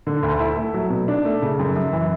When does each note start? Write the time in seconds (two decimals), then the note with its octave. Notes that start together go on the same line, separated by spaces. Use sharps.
0.07 D3
0.23 D2
0.39 E4
0.57 A3
0.74 F#3
0.90 B2
1.08 D4
1.25 A3
1.42 C#3
1.59 F#2
1.76 F#2
1.93 E3